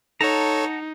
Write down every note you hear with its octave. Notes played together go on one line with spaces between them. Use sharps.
D#4 A4 C#5 F#5 A5 A#5